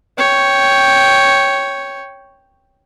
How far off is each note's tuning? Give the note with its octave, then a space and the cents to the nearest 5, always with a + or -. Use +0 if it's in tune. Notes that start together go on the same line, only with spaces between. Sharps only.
C#5 +0 G5 +0